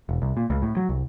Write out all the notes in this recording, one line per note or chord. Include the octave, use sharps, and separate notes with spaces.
E1
C2
A#2
C#2
A2
F#3
C2